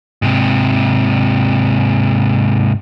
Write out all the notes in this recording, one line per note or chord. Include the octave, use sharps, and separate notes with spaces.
G#2 C3